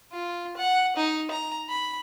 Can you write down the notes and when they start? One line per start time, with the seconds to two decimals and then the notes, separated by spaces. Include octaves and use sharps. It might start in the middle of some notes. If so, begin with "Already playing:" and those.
0.13 F4
0.57 F#5
0.97 D#4
1.31 A#5
1.69 B5